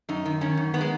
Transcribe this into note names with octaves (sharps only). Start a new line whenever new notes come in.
F#2 D#4
D#3
D#3 C#4
F#2
D#3 B3
G#3